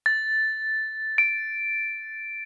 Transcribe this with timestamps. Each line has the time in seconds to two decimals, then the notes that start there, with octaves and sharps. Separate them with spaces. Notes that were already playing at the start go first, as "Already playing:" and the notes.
0.06 A6
1.18 D7